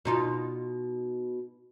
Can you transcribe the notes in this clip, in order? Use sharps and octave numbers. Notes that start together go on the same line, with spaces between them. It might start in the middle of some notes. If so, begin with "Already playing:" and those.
B2 D#4 F4